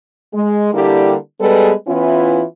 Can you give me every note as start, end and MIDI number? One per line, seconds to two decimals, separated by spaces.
0.34 0.70 56
0.73 1.15 50
0.73 1.15 55
0.73 1.15 58
0.73 1.15 62
0.73 1.15 64
0.73 1.15 67
1.40 1.73 55
1.40 1.73 56
1.40 1.73 59
1.40 1.73 68
1.40 1.73 69
1.40 1.73 71
1.87 2.44 52
1.87 2.44 59
1.87 2.44 61
1.87 2.44 64
1.87 2.44 65